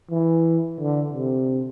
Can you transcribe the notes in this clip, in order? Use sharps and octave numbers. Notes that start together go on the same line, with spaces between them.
E3
D3
C3